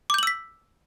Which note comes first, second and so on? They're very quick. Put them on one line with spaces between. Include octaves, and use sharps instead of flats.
D6 G6 F#7 E6 B6